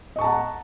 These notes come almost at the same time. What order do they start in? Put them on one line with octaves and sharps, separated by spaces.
D#5 C#6 A5 A#5 F#5